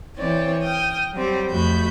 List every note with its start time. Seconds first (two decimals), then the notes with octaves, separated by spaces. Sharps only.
0.17 E3 C4 C#5 D5
0.61 G5 D#6 F6
1.13 F#3 G3 C4
1.49 F2 A3 F#4 B5 G6